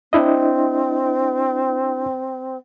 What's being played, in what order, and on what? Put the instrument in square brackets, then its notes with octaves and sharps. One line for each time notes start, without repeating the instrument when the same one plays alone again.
[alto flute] C4 [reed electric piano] D4 E4 D#5